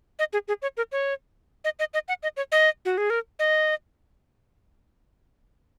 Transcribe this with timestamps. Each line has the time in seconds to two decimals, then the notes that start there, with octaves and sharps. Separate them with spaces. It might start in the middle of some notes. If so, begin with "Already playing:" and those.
0.19 D#5
0.33 G#4
0.48 G#4
0.62 C#5
0.77 A#4
0.92 C#5
1.64 D#5
1.79 D#5
1.94 D#5
2.08 F#5
2.23 D#5
2.37 C#5
2.52 D#5
2.85 F#4
2.98 G#4
3.10 A#4
3.39 D#5